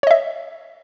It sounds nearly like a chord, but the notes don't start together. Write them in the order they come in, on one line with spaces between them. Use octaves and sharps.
C#5 D#5 E5